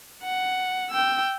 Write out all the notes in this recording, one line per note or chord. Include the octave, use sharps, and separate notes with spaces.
F#5
G5 E6